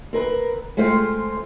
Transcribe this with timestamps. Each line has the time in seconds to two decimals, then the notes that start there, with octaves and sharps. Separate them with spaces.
0.13 C4 A#4 B4
0.77 G#3 A3 C4 F4 C5